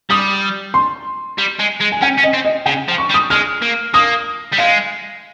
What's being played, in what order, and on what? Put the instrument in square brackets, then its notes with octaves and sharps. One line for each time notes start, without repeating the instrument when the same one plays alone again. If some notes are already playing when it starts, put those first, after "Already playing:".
[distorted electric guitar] G3 [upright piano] D#6
[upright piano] C6
[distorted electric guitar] G3
G#3
G#3
[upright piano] G#5
[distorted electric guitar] C#4 [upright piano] G5
[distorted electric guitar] C#4
[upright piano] D#5
[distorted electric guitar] C4
[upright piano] D#5
[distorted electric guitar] C#3 [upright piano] G5
[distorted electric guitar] F3
[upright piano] C#6
[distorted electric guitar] G3
[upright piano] D#6
[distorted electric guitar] G#3 [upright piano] F6
[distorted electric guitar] A#3
[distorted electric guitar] A#3 [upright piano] D#6
[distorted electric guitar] G3
[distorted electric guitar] G#3 [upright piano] F5